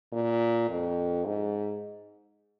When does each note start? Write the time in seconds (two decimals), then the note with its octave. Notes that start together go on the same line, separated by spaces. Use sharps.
0.12 A#2
0.69 F2
1.26 G#2